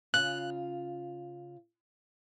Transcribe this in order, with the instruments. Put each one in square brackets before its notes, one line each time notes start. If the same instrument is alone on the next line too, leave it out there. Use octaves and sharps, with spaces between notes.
[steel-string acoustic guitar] C#3 F4 [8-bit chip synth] F#6